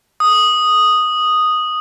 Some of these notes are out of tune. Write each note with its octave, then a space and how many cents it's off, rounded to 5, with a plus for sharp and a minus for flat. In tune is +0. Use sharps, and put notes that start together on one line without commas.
D#6 -5